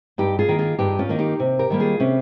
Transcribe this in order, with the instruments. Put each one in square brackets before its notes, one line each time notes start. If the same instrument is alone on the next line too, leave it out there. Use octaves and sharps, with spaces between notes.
[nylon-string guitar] G2 D#4 G4
F4 G#4
D#3 A#3
F4 G#4
G2 D#4 G4
C#4 F4
D#3 A#3
D#4 G4
C3
G4 A#4
D#3 G3 A#3
F4 G#4
C3 C#4